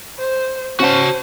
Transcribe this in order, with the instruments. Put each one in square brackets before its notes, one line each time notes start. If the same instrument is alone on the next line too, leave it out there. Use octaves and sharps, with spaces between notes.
[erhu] C5
[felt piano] C#4 F#5 [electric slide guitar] F#4 A5 [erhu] C5